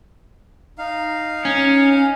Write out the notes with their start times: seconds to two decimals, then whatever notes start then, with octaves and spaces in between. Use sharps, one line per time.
0.79 D#4 F5
1.45 C#4